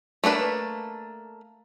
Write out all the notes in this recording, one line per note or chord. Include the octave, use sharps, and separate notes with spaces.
A3 A#3 D4 B4